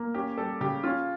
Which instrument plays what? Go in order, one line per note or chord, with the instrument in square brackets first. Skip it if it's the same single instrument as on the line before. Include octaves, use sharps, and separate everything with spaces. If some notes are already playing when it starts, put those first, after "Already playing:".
Already playing: [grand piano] A#3
C#4 G4
G3 A4
C#3 G4
C#4 F4